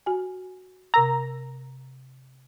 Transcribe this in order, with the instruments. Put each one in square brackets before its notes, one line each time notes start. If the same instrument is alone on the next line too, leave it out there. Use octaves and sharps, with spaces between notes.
[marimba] F#4 G#5
[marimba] C3 A#4 E6 [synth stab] A#5